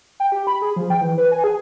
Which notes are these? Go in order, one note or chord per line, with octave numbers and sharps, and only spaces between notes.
G5
G4
B5
G#4
F3
G5
E3
B4
G#5
G#4